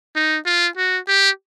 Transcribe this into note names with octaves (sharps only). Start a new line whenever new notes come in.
D#4
F4
F#4
G4